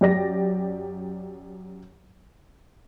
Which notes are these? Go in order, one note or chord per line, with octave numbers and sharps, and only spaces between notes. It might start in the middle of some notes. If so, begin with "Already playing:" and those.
F#2 G4 D5 A#6